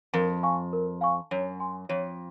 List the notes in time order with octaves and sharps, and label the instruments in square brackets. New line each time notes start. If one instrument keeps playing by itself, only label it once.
[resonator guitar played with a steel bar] F2 [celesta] A#4
[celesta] F5 G#5 C#6
A#4
F5 G#5 C#6
[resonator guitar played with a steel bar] F#2 [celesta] C#5
[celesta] G#5 C6
[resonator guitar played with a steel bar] F2 [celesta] C#5